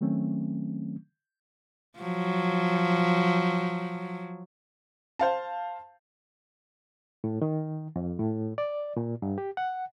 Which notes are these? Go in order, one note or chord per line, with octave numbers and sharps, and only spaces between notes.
D#3 F#3 A3 C4 C#4
F3 F#3
C5 F5 A5
A2
D#3
F2
A2
D5
A#2
G2
G4
F#5